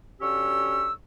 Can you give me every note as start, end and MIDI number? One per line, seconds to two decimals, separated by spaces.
0.21 0.91 50
0.21 0.91 54
0.21 0.91 61
0.21 0.91 67
0.21 0.91 85
0.21 0.91 88